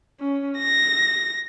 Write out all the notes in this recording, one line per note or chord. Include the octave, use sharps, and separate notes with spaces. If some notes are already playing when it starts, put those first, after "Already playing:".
C#4
A#6